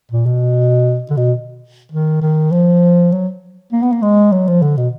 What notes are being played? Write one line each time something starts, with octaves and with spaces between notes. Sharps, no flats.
A#2
B2
D3
B2
D#3
D#3
F3
F#3
A#3
B3
A#3
G#3
F#3
F3
D3
B2